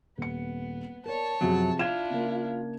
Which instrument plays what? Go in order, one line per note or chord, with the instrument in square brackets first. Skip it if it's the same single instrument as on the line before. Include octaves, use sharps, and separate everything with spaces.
[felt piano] D#1 C#7 [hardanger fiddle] B3
[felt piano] A#4 D5 [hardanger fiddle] C#5 A5
[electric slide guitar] F#2 F#3 [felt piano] C3 F3 G#4
[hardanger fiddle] D4 E4 [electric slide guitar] F4 [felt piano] G#6 E7
[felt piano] C#3 A#3